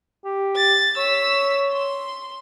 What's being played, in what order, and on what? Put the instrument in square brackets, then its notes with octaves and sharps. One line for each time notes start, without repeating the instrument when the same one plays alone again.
[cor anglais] G4
[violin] A6
[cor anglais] C#5 [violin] E6 B6
[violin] C6